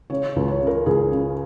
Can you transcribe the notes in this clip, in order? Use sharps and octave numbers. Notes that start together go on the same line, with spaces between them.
C#3 C#5
C#2
C#5
C#3
A#4
C#2 G#4
C#3